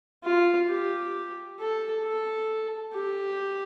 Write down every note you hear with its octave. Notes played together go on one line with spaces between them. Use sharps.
F4
G4
A4
A4
G4